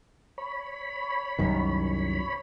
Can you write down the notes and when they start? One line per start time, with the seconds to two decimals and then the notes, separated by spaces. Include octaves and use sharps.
0.38 C#5 B5
1.39 C2 F#2 D#3